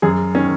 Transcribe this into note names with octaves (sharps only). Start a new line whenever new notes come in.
F#2 G#4
D#3 C#4